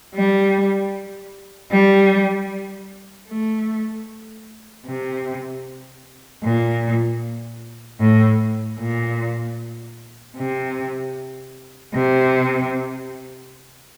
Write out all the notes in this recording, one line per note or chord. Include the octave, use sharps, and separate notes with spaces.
G3
G3
A3
C3
A#2
A2
A#2
C3
C3